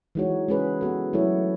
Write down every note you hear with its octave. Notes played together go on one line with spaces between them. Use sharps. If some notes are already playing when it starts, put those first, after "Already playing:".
E3 G#3 D#4 F#4 C#5
G#3 C#4 G#4 B4
B3 F#4 A4
F#3 A3 E4 A4 C#5